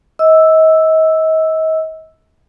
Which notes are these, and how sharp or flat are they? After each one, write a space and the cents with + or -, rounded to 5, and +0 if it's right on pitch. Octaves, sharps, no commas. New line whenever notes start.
D#5 +40 E6 +0